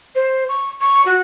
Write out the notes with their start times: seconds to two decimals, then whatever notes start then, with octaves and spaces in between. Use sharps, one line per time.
0.15 C5
0.49 C#6
0.81 C#6
1.06 F#4